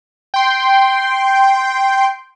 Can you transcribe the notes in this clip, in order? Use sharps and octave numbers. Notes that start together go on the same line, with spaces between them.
G5 C6